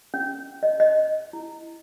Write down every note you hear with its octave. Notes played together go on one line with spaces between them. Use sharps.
C#4
D#5
D#5
E4